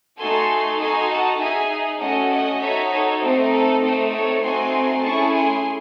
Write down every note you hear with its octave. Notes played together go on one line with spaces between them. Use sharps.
A3 D#4 F#4 A4 G#5 C6
D#4 F#4 A4 G#5 C6
F#5 A5
D#4 G#4 E5 G#5
A3 C#4 F#4 A4 D#5 F#5
D#5 F#5
D#4 F#4 A4 C#5 E5
A4 C#5
A3 C4 D#4 C5
A4
A3 C4 D#4 C5
A4 C#5
A3 C4 D#4 F#4 G#5 C6
A3 C#4 E4 G#4 A5 C#6
G#5 C6